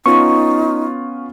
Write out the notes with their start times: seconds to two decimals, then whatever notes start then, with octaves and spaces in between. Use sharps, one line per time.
0.06 B3 C#4 D#4 F4 C#6